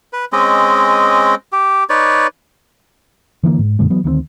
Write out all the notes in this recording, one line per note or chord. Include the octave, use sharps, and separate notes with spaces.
B4
G#3 C4 C#4 D#5
G4
D#4 B4 C#5 D5
D3 E3 G#3 A#3
G#2
F#2 A#2 D3 G#3
E3 F#3 B3
D2 D#3 A#3 C4